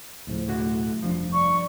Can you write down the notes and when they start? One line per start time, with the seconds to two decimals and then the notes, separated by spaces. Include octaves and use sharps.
0.27 D2 A2 C#3 F3
0.48 B1 D3 A3 F#4
1.03 F1 G2 F3 D4
1.32 D5 C#6